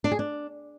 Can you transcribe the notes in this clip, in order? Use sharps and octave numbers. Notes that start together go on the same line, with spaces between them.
D4
G#4
D4